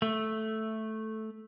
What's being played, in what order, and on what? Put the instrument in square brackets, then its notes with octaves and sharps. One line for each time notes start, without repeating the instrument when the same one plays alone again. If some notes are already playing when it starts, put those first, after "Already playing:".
[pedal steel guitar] A3